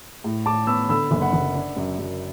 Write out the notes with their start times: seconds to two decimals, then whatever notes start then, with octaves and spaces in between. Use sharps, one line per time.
0.24 A2
0.46 A2 A5 D6
0.67 B3 B5 E6
0.89 D3 B5 E6
1.11 F#1
1.22 F#5 B5
1.33 F#1
1.54 D4
1.76 F#2
1.99 F#2